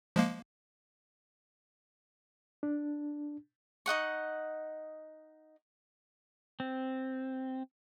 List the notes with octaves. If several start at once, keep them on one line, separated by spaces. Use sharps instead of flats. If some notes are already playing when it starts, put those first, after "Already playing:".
F3 G#3 A#3
D4
D#4 D#5 F#5 C#6
C4